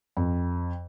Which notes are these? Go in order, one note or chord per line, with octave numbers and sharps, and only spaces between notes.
F2